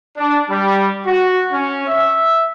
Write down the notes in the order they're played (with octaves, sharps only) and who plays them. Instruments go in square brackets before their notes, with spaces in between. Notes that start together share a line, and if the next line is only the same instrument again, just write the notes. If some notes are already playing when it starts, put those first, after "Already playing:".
[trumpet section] D4
G3
F#4
C#4
E5